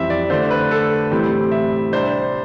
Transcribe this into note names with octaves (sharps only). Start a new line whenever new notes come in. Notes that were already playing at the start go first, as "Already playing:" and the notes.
Already playing: F2 E3 G3 C4 E5
D5
D3 A3 D4 C5
B4
A4
A2 E3 G3 C4
E5
C3 G3 D4 C5